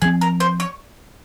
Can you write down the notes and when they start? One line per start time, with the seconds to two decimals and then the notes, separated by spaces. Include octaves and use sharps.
0.02 F3 C4 G#4
0.21 A#4
0.40 C5
0.60 C#5